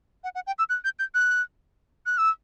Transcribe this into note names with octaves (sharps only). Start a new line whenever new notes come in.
F#5
F#5
G5
E6
F#6
G6
G6
F#6
F#6
E6